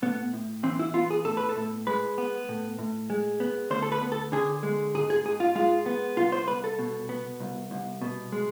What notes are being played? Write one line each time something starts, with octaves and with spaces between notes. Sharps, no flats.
A2 B3
A2
E3 C4
E4
B3 F4
G#4
A2 A4
B4
A4
A2
G#3 B4
B3
A2
A2
G#3
B3
D2 C5
A4
B4
B3
A4
D3 G#4
G#3
G#2 G#4
G#4
G#2 G#4
F4
G#3 F4
B3
C2 F4
C5
C2 B4
A4
B2
B3
C2
C2
B2
G#3